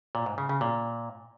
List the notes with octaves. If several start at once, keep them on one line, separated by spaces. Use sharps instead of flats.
A#2
G#2
C#3
C#3
A#2